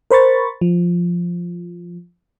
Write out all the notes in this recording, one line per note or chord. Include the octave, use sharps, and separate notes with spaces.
A#4 C5 B5 C#6 A6
F3